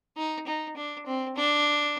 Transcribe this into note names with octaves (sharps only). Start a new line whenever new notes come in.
D#4
D#4
D4
C4
D4